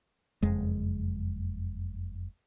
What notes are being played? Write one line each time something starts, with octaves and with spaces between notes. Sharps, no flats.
F#1 F2 G#3